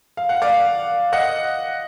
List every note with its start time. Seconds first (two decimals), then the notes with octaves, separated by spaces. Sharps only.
0.17 F5
0.29 F#5
0.42 D5 F5
1.13 D#5 F#5